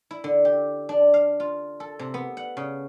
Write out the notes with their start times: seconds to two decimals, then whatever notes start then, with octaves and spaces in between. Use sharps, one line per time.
0.11 E4
0.24 D3
0.45 G4
0.89 D4
1.14 F5
1.40 F4
1.80 A4
1.99 C3
2.14 B3
2.37 F#5
2.57 C#3